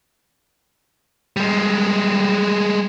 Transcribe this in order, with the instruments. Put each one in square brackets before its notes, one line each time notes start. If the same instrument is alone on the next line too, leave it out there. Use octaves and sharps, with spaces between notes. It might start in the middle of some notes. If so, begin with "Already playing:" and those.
[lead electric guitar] G3 G#3